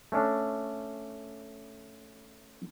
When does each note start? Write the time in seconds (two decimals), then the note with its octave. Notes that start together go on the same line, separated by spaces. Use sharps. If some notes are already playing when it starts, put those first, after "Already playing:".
0.12 A3 C#4 D4